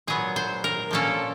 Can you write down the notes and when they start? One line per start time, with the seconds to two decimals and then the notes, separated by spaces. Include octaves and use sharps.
0.07 A#2 F#3 B3 G#4
0.36 C5
0.64 A#4
0.91 A#2 F3 A#3 C#4 A4